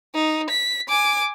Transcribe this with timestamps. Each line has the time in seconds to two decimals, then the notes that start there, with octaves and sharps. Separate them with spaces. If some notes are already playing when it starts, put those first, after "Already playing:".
0.14 D#4
0.49 B6
0.89 G#5 D6